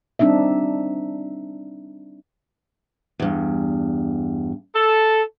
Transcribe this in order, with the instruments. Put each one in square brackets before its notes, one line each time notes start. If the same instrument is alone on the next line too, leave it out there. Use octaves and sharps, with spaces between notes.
[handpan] G3 C4 D4 D#4 E5
[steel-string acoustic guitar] E2 G2
[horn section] A4